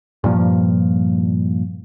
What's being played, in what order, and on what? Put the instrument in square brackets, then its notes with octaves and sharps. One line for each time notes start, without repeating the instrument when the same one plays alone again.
[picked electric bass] G2 A#2 F3